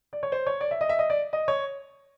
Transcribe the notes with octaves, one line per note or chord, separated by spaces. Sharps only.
D5
C#5
C5
C#5
D5
E5
D#5
E5
D#5
D5
D#5
C#5